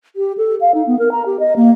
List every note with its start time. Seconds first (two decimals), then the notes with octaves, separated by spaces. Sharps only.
0.16 G4
0.38 A4
0.61 F5
0.74 D#4
0.87 B3
0.99 A#4
1.12 A#5
1.26 G4
1.40 D#5
1.56 A#3